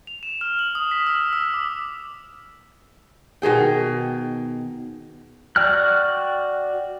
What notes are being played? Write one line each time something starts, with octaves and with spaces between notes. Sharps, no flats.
F7
E7
F6
F#7
D#6
B6
E6
E6
D6
B2 D#3 G#4 G5
F#4 D5 G5 F6 F#6